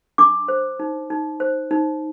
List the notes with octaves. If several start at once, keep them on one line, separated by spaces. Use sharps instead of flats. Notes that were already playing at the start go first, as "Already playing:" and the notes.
D4 D6
C5
D#4
D#4
C5
D#4